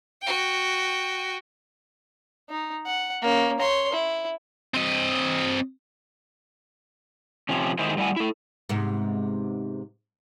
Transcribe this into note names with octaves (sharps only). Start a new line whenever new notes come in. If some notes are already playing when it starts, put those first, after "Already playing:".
F#4 G5
D#4
F#5
A#3 C#4
C#5 C6
E4
C4 D#5
C3 F3 C#4
D#3 G#3 E4 G#4 C5
A2 G3 E4 F#5 G#5
E4 A4
G#2 C3 B3